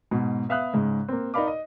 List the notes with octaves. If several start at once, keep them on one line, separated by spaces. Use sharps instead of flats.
G#2 B2
B3 E5 F5 D#6 F#6
G#2 C#3 G#3
A#3 C4
D#4 A#4 D5 F5 B5 D6
D#5